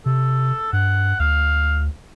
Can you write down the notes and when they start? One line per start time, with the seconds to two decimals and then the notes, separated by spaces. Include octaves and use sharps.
0.06 C3 A4
0.73 G2 F#5
1.20 D2 F5